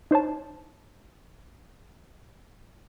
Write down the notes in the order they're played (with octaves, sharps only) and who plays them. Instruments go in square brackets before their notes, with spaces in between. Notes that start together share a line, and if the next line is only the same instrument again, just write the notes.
[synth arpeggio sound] D#4 C5 C#5 A5